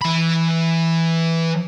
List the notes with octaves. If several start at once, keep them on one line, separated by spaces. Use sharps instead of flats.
E3 B5